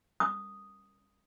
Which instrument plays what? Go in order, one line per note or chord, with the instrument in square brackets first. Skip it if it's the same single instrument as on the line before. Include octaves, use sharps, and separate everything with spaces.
[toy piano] D#6